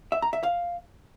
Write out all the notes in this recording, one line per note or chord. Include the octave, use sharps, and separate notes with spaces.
E5
A#5
E5
F5